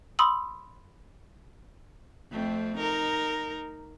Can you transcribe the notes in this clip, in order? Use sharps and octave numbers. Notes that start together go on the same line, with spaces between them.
B5 C6 D#6 E6 F#7
F2 A3 C4
D#4 A#4